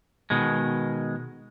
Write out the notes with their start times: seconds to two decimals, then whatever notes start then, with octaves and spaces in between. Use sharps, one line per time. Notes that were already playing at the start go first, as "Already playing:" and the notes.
0.30 B2 D#3 G#3